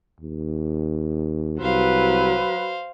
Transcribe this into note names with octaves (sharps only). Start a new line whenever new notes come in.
D#2
C2 F#3 B4 C5 F5